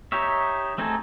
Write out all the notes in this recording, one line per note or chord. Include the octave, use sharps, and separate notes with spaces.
D#4 G4 C#5 E5
A3 C4 D#4 G#4 A4